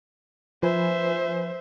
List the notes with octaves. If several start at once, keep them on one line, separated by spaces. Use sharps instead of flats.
F3 B4 C5 E5 G#5